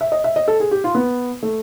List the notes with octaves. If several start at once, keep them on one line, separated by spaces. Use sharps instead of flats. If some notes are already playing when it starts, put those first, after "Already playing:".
E5
D#5
E5
D#5
A4
G#4
G4
F4
B3
A3